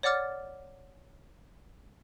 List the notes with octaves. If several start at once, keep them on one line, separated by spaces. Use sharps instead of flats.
C#5 D5 F#5 D6 F6 A6